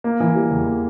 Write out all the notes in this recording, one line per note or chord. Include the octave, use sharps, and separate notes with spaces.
A#3
E3
G3
E2
A#3